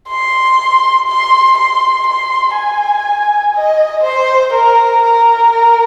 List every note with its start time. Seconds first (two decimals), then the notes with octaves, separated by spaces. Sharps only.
0.09 C6
1.08 C6
1.58 C6
2.07 C6
2.56 G#5
3.55 D#5
4.04 C5
4.54 A#4
5.03 A#4
5.52 A#4